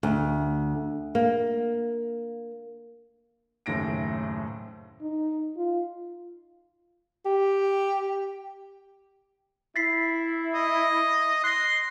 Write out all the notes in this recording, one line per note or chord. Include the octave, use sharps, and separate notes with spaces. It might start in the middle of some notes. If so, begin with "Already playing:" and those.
D2
A#3
F#1 D#2 A2 A#6 D7
D#4
F4
G4
E4 A6 B6 C7
D#5
C6 F#6 A#6